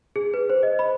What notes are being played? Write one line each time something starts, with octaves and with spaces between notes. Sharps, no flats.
G#4
B4
C5
D#5
B5